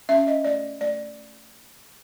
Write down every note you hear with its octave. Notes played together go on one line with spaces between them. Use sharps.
C#4 E5
D#5
A3 D5
A3 D5